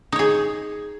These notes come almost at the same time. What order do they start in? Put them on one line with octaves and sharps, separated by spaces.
D#4 C#5 G#4